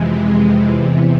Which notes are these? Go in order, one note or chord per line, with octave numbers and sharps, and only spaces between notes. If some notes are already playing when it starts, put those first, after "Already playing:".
Already playing: F2 C3 E3 G#3
E2 C3 E3